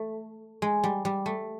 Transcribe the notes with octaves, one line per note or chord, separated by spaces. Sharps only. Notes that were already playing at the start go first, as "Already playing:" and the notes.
Already playing: A3
G#3
G3
G3
A3